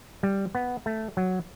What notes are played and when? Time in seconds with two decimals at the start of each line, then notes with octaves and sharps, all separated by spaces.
0.23 G3
0.55 B3
0.86 A3
1.17 F#3